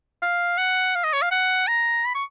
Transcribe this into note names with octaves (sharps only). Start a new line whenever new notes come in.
F5
F#5
F5
D#5
C#5
F5
F#5
A#5
B5
C#6